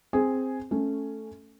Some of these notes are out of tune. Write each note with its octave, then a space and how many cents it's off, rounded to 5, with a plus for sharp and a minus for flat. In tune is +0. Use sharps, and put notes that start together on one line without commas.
C4 +0 G#4 +0
A3 +0 C#4 +0